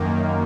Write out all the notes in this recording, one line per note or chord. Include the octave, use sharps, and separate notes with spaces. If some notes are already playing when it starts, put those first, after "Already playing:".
Already playing: F#2 D#3 A#3